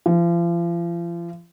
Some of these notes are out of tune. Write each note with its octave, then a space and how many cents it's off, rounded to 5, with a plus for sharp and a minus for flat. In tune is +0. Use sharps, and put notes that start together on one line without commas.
F3 -40